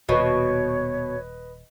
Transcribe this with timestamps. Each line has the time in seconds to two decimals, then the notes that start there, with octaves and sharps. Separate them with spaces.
0.09 D#1 B2 B4 C#5 D#5